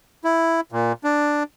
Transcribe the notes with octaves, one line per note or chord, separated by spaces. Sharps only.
E4
A#2
D4